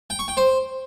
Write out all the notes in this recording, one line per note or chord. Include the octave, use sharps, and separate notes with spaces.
G5
C#6
G5
C5